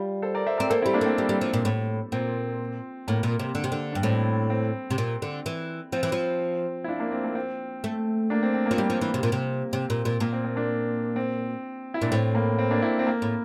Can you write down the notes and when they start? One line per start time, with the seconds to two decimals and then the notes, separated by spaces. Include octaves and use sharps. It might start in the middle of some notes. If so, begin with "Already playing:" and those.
Already playing: G3 F4
0.22 A4 C5
0.34 A#4 D5
0.46 C5 E5
0.58 C4 A#4 D5
0.70 A#3 A4 C5
0.82 G3 C4 E4
0.94 A#3 D4
1.01 A3 C4
1.18 G3
1.29 G3
1.41 F3
1.53 A#2
1.65 A2
2.12 A#2 C4
3.08 A2 A#3
3.23 A#2
3.39 C3
3.55 D3
3.64 C3
3.72 D3
3.93 G2 D4
4.03 A2 C4
4.50 C4
4.90 C3
4.98 A#2
5.22 D3
5.46 E3
5.92 F3 C4
6.03 E3
6.12 F3
6.84 E4
6.88 D4 F4
7.00 A#3 D4
7.12 C4
7.24 A#3
7.35 C4
7.84 A3
8.30 A#3 D4
8.43 C4
8.54 C4
8.66 A#3
8.71 F3
8.78 G3
8.90 F3
9.02 E3
9.14 C3
9.23 A#2
9.32 C3
9.73 C3 C4
9.90 A#2
10.05 A#2
10.20 A#2 A#3
10.33 C4
10.44 C4
10.56 A#3 D4
11.16 C4
11.94 E4
12.02 A#2 D4
12.11 A2 C4
12.35 A#3
12.59 C4
12.71 A#3 D4
12.82 C4 E4
12.99 C4
13.07 A#3
13.22 A2